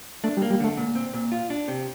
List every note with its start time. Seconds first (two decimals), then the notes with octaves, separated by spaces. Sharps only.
0.24 A3 D4
0.37 G3
0.42 A#3
0.50 G3
0.60 D3 A3
0.77 A#2
0.95 C4
1.14 A#2
1.32 F4
1.50 D4
1.68 C3